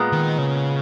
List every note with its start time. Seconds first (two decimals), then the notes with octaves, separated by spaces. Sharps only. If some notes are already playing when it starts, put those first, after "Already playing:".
Already playing: A#2 G#3 B3
0.12 D#3
0.38 C#3